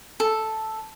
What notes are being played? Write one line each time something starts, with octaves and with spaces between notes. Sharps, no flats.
A4